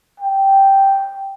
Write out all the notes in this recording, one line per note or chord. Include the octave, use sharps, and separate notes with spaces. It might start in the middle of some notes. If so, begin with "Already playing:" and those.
G5